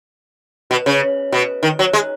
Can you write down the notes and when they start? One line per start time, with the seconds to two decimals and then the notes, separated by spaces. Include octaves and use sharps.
0.71 B2
0.86 C#3
1.32 B2
1.63 D#3
1.79 F#3
1.93 G#3